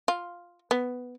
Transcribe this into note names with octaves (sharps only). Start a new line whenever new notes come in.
F4
B3